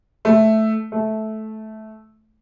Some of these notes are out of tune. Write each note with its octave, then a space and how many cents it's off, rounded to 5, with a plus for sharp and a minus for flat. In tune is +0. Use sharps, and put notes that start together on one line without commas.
A3 -5
A3 -15